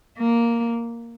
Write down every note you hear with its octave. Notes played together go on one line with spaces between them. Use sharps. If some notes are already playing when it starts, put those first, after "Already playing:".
A#3